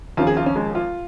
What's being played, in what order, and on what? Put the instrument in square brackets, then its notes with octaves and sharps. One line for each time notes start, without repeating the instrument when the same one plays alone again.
[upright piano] D#2 C#3 F3 F4
G#4
F4
C#4
G#3
F4